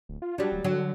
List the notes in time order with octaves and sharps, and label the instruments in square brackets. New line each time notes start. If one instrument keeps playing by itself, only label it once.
[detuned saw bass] D1
F4
[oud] F#3 G3 [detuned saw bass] D4
[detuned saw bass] D1
[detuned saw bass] D3 [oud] F#3